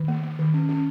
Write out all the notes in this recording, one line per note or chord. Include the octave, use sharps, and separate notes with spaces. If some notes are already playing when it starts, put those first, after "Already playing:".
Already playing: D#3
A#3
A#3
D#3
C#4
C#4